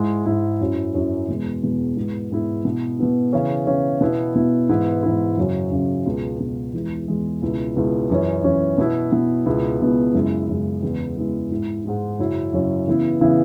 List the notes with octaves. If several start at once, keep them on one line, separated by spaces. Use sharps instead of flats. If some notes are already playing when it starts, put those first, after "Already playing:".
Already playing: G#2 G#3 E4
G#2 G#3 E4
F#2 F#3 C#4 E4
F#2 F#3 C#4 E4
E2 B2 G#3
E2 B2 G#3
G#2 G#3 B3 E4
G#2 G#3 B3 E4
B2 B3 E4
B2 B3 E4
C#3 E3 C#4
C#3 E3 C#4
B2 B3 E4
B2 B3 E4
G#2 E3 B3 E4
G#2 E3 B3 E4
F#2 C#3 F#3 C#4
F#2 C#3 F#3 C#4
C#2 B2 B3
C#2 B2 B3
E2 E3 G#3
E2 E3 G#3
C#2 B2 B3 E4
C#2 B2 B3 E4
F#2 E3 C#4
F#2 E3 C#4
B2 B3 E4
B2 B3 E4
C#2 B2 B3 E4
C#2 B2 B3 E4
F#2 C#3 G#3 E4
F#2 C#3 G#3 E4
E2 C#3 G#3 B3 E4
E2 C#3 G#3 B3 E4
G#2 G#3 E4
G#2 G#3 E4
F#2 C#3 F#3 C#4 E4
F#2 C#3 F#3 C#4 E4
C#3 E3 B3 E4
C#3 E3 B3 E4